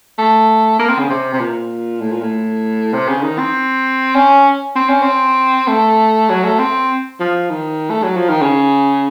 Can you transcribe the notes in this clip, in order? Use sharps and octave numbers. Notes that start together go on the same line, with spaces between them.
A3
A#3
C4
C#3
C3
C3
A#2
A2
A#2
A2
C3
C#3
D#3
C4
C#4
C4
C#4
C4
A3
F#3
A3
C4
F3
D#3
A3
F#3
F3
D#3
C#3